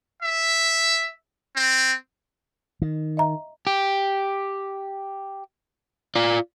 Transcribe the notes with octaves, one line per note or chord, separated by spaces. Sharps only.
E5
C4
D#3
D#5 E5 A#5
G4
F4 D5